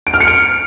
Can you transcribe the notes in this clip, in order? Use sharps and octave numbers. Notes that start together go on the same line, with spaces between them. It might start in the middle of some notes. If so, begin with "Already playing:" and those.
D7
F6
C#7
D7